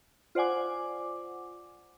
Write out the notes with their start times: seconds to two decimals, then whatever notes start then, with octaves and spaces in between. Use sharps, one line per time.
0.35 F4 C5 D5 F#5 G#5 D6